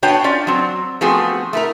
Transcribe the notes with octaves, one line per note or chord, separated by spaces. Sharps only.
B3 D4 F#4 C#5 G5 A5
C#4 F4 D5
F#3 C4
F3 A3 B3 C4 F#4 G#4
A3 E4 A#4